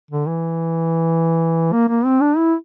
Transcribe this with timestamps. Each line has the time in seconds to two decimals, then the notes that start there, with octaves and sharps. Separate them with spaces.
0.11 D3
0.27 E3
1.72 A#3
1.89 A#3
2.05 C4
2.21 D4
2.37 E4